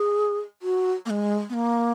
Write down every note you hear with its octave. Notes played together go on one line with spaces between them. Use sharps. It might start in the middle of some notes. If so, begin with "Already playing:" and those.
Already playing: G#4
F#4
A#3
G#3
B3
A#3